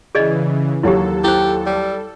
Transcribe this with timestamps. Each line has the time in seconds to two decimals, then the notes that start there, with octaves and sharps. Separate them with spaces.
0.15 C#3 E3 G#4 D5 D#5
0.83 D#2 F#3 E4 G4 A4 C#5
1.24 E4 G4 C5
1.66 G3